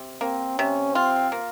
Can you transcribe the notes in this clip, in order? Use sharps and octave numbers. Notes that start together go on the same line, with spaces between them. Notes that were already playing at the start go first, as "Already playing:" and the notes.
Already playing: C3
A#3 C4
C3 C#4
C4 F4
A#3